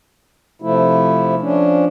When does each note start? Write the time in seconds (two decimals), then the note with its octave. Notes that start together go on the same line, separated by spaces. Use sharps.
0.62 C3 F3 A3 E4
1.41 F3 C#4 D4